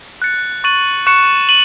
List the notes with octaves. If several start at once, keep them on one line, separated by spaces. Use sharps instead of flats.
F#6 A6 C#7
C#6 F#6 A6 D#7 F#7
C#6 F#6 C#7 E7
D#7 F#7